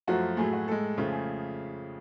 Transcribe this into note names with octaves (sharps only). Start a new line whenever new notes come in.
F#2 F3 A3 F#4
A2 F#3 A3 G#4
F#4
A2 G#3 A4
F2 C#3 F3 A3
G#4